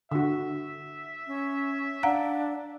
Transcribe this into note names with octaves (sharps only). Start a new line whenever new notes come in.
D3 F#4 E5
C#4
D4 F5 F#5 A#5